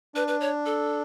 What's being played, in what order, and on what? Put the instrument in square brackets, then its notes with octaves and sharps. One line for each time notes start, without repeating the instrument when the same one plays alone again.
[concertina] D4 [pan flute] B4
[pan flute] B4
C#5
A4